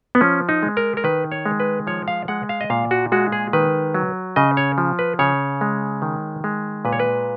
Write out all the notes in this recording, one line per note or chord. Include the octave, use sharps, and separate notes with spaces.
B3
F3 C#4
D#4
G#3
A#4
A#4
D#3 B4
C#5
G#3
B4
F3 C#5
F5
G#3 F#5
F5
D#5
A#2 F5
F#4
G#3 F#4
G#4
D#3 B4
F#3
C#3 D#5
C#5
F3
B4
C#3 C#5
G#3
D#3
G#3
A#2 B4
C#5
B4